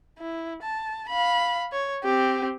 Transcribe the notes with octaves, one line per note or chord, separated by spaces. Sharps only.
E4
A5
F5 B5
C#5
C4 G4